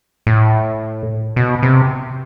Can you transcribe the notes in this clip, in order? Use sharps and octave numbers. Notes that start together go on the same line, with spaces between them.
A2
B2
C3